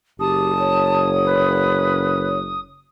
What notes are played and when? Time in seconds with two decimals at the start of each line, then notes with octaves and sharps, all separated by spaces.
0.20 F#1 G4 A5 D#6
0.59 C#5
1.25 B4